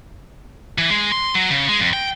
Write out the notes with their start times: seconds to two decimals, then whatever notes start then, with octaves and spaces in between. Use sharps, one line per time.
0.78 E3
0.90 G#3
1.12 C6
1.35 F#3
1.51 C#3
1.69 G#3
1.80 F2
1.93 G5